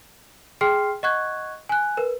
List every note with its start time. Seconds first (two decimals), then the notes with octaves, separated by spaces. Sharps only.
0.61 G#4 G5 C6 F6 C7
1.03 D#5 F#5 C#6 F#6 G#6
1.69 G#5 F#6
1.97 A#4 B4